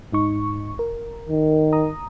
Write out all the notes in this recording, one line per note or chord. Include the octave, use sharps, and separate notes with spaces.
G#2 D#4 C#6
A#4
D#3
A#5 D#6